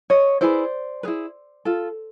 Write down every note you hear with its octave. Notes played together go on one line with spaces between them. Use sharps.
C#5 D#5
E4 G#4 B4 C5 D5
E4 G#4 B4
F4 A4